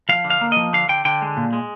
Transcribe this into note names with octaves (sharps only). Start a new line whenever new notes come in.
F3 F5
D3
F5
A#3
F3 D#5
D3 F5
D3 G5
D3 G5
G#3
A#2
G#3